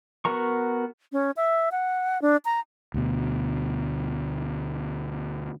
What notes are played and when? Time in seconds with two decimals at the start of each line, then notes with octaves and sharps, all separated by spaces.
0.25 B3 F#4 A#4 A#5 C#6
1.12 C#4
1.37 E5
1.72 F#5
2.22 D4
2.45 A#5
2.94 D2 B2